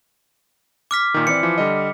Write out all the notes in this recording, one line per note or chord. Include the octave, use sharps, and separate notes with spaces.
D6 F6 B6
A#2 D#3
E3 C4 D5 C#7
E3 F3
D3 G3 D#5